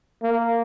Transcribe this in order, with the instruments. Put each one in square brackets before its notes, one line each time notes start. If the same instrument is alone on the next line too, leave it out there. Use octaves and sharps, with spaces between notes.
[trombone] A#3